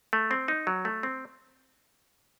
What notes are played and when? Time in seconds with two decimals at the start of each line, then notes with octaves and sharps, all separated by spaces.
0.13 A3
0.31 C4
0.48 D#4
0.67 F#3
0.85 A3
1.03 C4